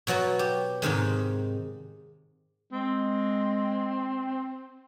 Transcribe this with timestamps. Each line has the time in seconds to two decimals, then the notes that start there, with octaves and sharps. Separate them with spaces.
0.07 B2 F#3 B3 F#4
0.39 G4
0.82 G#2 C3 D#3 G#3
2.72 G#3 C4